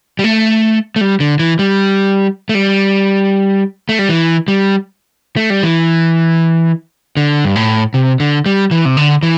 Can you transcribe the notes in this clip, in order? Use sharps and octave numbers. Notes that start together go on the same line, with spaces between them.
G3
A3
A3
G3
D3
E3
G3
A3
G3
A3
G3
E3
G3
A3
G3
E3
D3
G2
A2
C3
D3
G3
E3
C3
D3
E3